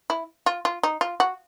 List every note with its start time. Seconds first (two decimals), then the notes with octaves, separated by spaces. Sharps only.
0.10 E4
0.46 F4
0.65 F4
0.83 D#4
1.01 F4
1.20 F#4